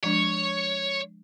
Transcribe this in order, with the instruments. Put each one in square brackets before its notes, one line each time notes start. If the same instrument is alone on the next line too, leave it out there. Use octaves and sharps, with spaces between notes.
[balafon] F3 G#3 D4 [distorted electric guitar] C#5